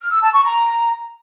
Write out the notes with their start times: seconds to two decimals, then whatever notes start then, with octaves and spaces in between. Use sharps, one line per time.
0.01 F6
0.11 E6
0.22 A5
0.33 C#6
0.44 A#5